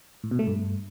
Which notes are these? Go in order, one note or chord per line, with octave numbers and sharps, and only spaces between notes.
A2
B2
A3
G2